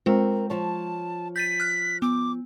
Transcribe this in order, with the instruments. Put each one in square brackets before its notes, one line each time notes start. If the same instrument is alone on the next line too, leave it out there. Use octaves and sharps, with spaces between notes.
[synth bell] G#3 F4 [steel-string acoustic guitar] C4 A#4
[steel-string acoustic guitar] F3 C#5 [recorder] A5
[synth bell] G6 A6 D#7 [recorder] B6
[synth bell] F6 F#6
[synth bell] B3 [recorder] D6